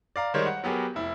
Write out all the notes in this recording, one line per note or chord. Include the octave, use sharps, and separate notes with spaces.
D5 F5 A#5
D#3 G3 G#3 A#4 C5 C#5
F#5
F#3 B3 G4 G#4 A#4
F1 E4